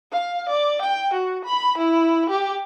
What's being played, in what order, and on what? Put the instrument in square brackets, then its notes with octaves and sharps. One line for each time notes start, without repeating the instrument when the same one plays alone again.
[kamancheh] F5
D5
G5
F#4
B5
E4
G4